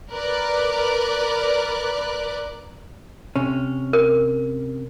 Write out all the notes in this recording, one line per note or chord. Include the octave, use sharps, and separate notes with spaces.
A#4 B4 D5 D6 F#6
C3 C#4
A#4